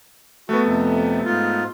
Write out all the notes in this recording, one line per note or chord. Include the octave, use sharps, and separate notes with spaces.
A3 B3 F#4
F2 C3
G#2 F4